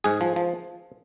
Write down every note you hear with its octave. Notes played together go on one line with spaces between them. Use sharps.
G#2 G#4
F3
F3